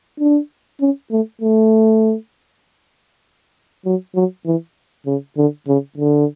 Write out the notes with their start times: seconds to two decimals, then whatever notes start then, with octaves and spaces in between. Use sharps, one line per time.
0.20 D4
0.81 C#4
1.11 A3
1.42 A3
3.85 F#3
4.15 F#3
4.46 E3
5.06 C#3
5.37 D3
5.68 C#3
5.98 D3